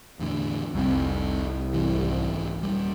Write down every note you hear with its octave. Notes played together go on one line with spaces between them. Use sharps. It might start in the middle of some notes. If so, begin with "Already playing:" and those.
E2 A2 D3
F1 C2 C4
G#1 C3 E3
D#1 C#2 G3